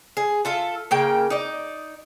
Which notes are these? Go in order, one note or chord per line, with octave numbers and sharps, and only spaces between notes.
G#4
F4 A4 E5
C#3 A#3 G5
D#4 D5